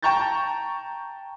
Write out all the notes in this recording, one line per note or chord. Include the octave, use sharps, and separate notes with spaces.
G5 A5 A#5 C#6 G6 A6